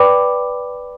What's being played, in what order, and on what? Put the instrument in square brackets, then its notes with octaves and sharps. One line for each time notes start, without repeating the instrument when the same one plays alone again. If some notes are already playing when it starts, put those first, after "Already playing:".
Already playing: [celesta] B4 D5 G5 B5 D6